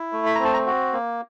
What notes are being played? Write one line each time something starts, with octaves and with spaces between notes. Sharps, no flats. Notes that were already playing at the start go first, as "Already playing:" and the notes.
Already playing: E4
A3
B5
A#5
C4
A5
A#5
F#4
A#3